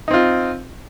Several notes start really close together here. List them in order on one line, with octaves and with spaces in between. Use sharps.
D#4 C4 F4